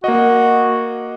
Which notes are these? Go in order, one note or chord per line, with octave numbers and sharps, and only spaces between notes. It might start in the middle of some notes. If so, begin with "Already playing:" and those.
A#3 F#4 D#5